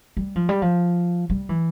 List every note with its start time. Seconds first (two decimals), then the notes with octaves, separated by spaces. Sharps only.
0.17 G3
0.36 F3
0.49 G3
0.62 F3
1.30 G3
1.49 E3